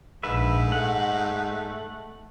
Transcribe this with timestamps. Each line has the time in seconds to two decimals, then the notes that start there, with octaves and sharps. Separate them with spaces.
0.23 A#1 G#2 B4 E5
0.72 A3 F#5